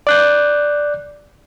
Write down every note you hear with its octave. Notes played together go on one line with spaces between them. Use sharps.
D5 F#6 G6